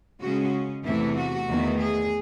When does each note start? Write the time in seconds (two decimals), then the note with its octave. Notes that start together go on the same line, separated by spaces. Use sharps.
0.21 C#3 G#3 C#4 F#4
0.84 E2 C3 E3 A3 E4
1.16 F#4
1.48 E2 D#3 A3
1.80 G#4